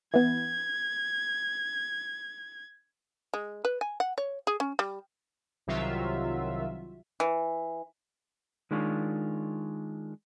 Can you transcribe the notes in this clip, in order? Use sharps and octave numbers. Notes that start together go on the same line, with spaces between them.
E3 B3 G#6
G#3
B4
G#5
F#5
C#5
G#4
C#4
G3
C2 C3 D#3 F#3 F4 E5
E3
D#3 G#3 D4 F4 C#5